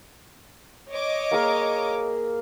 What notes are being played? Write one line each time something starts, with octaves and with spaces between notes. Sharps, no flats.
C#5 D#5 D6
A#3 G#4 A#4